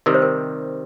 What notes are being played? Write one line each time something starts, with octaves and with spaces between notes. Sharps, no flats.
C3 D#3 G3 A#4
C5
A#4